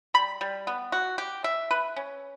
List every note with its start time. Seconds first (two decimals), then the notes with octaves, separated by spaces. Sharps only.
0.14 G3 B5
0.41 G3
0.67 B3
0.92 F#4
1.18 G4
1.44 E5
1.71 B4
1.96 C#4